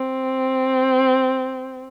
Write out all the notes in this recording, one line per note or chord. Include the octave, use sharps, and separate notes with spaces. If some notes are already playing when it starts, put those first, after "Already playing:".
Already playing: C4